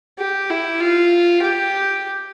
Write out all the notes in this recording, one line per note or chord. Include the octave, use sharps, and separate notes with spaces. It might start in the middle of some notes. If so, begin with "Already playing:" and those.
G4
E4
F4
G4